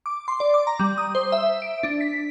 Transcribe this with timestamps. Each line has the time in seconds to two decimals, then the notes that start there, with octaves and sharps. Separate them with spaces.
0.06 D6
0.28 C6
0.40 D5
0.54 D6
0.67 A#5
0.80 G3
0.98 D#6
1.15 C5
1.32 E5
1.62 D7
1.83 D4
2.01 B6